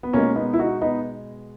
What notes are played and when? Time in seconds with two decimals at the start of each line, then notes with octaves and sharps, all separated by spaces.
0.03 B3
0.13 B2 G#3 A#3 C#4
0.36 B3 D#4
0.53 E4
0.59 D#4 F#4
0.81 B3 D#4